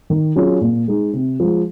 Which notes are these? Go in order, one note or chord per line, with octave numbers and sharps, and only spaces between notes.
D#3
F#3 C#4 F4 G#4
A#2
G#3 D#4
C3
F3 G#3